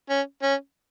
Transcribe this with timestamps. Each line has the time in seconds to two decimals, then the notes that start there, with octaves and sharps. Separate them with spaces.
0.10 C#4
0.43 C#4